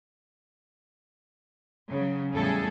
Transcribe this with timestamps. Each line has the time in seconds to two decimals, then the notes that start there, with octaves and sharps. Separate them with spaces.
1.90 C#3 F#3
2.33 E2 A2 C#3 G3 G#4 A4